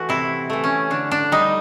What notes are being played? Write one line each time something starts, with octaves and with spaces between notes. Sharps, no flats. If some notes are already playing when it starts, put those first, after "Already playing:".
Already playing: E3 A3 F#4
C3 E4
E3 A3
C#4
D3 D4
D4
G3 D#4